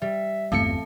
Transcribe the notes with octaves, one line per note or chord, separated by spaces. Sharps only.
G3 E5
G1 E2 A3 C4 F5 A5 C#7